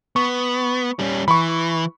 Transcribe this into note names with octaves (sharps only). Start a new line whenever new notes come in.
B3 C#6
G3 C#4
E3 B5 C#6